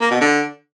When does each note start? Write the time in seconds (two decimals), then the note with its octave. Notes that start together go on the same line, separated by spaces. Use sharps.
0.01 A#3
0.11 B2
0.21 D3